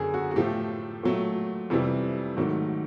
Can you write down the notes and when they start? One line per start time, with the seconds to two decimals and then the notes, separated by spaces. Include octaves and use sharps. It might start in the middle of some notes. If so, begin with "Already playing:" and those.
Already playing: F#2 D3 F#3 G#4 A#4
0.14 F#4
0.31 F#4
0.36 A2 F3 A3 G4
1.03 A#2 F#3 A3
1.70 F2 C3 E3 G3
2.37 G#2 D#3 F#3 A3